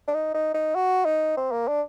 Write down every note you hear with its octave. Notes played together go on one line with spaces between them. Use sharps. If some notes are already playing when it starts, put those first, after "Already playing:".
D4
D#4
D#4
D#4
F#4
D#4
C4
A#3
D4